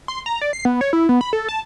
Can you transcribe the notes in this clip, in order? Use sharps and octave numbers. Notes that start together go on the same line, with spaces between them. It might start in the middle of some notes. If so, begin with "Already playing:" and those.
C6
A#5
D5
C7
B3
C#5
E4
B3
B5
A4
A5